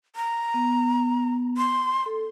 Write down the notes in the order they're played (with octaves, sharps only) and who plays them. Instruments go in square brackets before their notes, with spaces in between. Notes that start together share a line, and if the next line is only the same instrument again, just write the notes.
[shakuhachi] A#5
[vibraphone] B3
[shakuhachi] C6
[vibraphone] A4